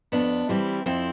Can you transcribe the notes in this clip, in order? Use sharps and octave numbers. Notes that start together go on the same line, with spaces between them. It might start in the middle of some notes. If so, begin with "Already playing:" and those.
F2 B3 D4
E3 G3 C4 E4
F2 C4 E4